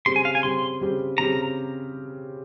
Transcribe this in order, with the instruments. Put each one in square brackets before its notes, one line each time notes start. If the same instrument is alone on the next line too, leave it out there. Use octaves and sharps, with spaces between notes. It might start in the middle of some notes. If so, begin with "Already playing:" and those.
[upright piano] C#3 G3 C4 G4 [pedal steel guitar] C6
[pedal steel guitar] G#5
F5
G#5
[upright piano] C#3 G3 C4 G4 [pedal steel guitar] C6
[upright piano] C#3 G3 C4 G4
[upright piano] C#3 G3 C4 G4 [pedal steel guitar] A#5